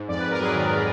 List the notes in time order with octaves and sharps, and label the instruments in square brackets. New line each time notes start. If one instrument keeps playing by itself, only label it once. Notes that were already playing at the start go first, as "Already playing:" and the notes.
Already playing: [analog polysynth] G#2
F2 D5
F2 B4
A#4
F#3 G#4 B4
D#3